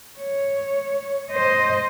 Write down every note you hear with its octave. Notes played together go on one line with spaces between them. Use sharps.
C#5
C5 D#5